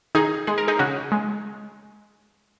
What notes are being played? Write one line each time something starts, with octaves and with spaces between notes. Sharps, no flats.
D#3 D#4 G#4
G#3 G#4
A#4
D#4 G#4
C#3 C#4 F#4
G#3